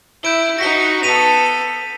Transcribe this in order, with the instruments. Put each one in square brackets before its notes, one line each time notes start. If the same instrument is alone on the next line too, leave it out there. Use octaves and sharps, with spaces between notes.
[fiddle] E4 [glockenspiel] G6 D7 G7
[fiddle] D#4 F#4 [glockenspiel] A#6 B6 G7
[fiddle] B3 A4 [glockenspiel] B6 D#7 F7